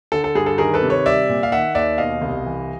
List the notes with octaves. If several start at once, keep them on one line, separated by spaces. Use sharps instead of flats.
D3 A4
A4
G2 G#4
A4
D#3 G#4 A#4
A4 B4
C3
B4 C#5
G3 D5 E5
A#2
F5
D#3 E5 F#5
D#2 D5 E5
B2 D#5 F5
C2
E3